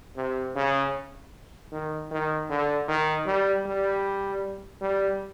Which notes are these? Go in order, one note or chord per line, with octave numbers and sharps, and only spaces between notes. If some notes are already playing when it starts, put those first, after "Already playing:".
C3
C#3
D#3
D#3
D3
D#3
G3
G3
G3